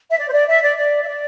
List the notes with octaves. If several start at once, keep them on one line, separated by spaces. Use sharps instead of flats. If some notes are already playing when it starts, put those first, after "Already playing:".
E5
D5
C5
D5
E5
D5
D5
E5
D5